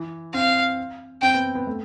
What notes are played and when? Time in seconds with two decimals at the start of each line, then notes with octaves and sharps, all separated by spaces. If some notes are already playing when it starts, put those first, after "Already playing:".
Already playing: E3
0.33 C4 F5
1.22 C4 G5
1.34 B3
1.55 B3
1.67 A3